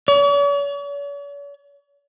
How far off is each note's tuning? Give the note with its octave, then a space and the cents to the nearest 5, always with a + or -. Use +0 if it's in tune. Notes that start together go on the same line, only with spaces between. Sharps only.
C#5 +45